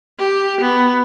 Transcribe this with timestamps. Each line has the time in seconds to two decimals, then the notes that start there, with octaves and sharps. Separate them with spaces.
0.19 G4
0.61 B3